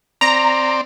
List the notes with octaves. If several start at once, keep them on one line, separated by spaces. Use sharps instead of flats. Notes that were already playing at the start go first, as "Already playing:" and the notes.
C4 D5 A#5